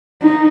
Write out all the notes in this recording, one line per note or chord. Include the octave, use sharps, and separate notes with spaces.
D#4